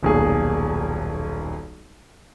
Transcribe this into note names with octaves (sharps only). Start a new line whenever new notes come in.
D#1 B1 A#2 G#4